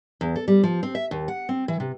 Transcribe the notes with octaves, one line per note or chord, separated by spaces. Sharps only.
E2
A4
G3
F3
C4
E5
D#2
F#5
C4
E3
C3